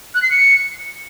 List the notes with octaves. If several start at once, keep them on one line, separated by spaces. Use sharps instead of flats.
F#6
C7
C#7